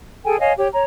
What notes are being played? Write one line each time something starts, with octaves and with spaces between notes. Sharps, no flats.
G#4 A4 G5 G#5
C#5 D#5 F5 G#5
G4 C#5
C#5 A#5